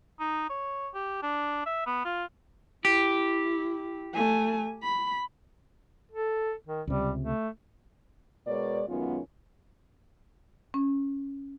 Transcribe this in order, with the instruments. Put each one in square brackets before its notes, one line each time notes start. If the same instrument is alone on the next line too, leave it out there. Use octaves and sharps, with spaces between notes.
[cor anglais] D#4
C#5
G4
D4
E5
B3
F4
[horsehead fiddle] E4 [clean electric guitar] G4
[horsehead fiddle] A3 G#5
B5
[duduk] A4
D#3
[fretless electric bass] C#2 C3 [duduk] G3
[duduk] A3
[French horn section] B2 G#3 A#4 C#5 D5
F#2 D#3 G#3 B3 C#4 F4
[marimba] C#4